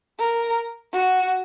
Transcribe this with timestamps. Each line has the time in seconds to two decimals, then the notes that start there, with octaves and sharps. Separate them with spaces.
0.19 A#4
0.93 F#4